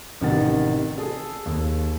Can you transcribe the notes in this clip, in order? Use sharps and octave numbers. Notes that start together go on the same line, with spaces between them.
A1 C3 D#3 F#5 A6
G#4 A4 A5
D#2